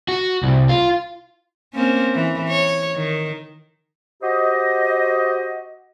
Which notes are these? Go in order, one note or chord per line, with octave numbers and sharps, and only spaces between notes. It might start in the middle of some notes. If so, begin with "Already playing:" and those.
F#4
C2
F4
A#3 C4 C#4
E3
C#5
D#3
F#4 G4 C5 D#5